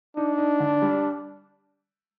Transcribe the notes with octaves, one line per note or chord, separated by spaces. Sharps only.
D4 D#4
D#4
D3
G3